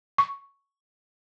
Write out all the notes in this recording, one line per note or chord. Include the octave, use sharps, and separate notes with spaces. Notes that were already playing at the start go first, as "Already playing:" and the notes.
C#6